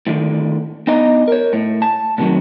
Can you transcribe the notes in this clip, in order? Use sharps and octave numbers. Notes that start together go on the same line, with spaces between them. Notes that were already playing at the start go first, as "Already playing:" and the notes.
A2 D3 D#3
B3 D4 D#4 D#5 A#5
A#4 C#5
A2
A5
A2 C3 D#3 F3 F#3